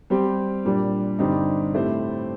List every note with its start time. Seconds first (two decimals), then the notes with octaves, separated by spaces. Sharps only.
0.10 G3 C4 G4
0.65 A#2 G3 D4
1.19 G2 D3 G3 C4 D#4
1.74 A2 A3 C4 G4 C5